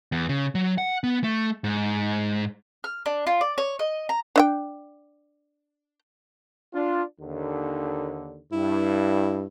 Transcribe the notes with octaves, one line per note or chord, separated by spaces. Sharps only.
E2
C#3
F#3
F#5
B3
A3
G#2
F6
D4
F4
D5
C#5
D#5
A#5
D4 E5 G5
D4 F4
D#2 D3
G2 E4